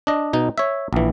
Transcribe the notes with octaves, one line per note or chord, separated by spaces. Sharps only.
D4 D#5
B2 D#4
C#5 E5
A#1 E3